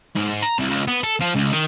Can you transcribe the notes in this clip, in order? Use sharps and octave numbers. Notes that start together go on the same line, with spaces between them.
G#2
A#5
C2
C#2
B3
A4
F3
C#2
D#3